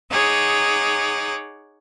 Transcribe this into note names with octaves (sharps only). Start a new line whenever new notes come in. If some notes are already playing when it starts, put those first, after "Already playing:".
D#4 G#4 C#5 F#5 D6